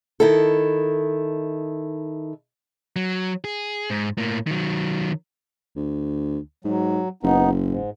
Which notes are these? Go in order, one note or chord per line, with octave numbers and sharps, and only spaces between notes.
D#3 E4 A4
F#3
G#4
G#2
A2 A#3
D#3 F#3
D2
G#2 F#3
F#1 B3 D#4
G#2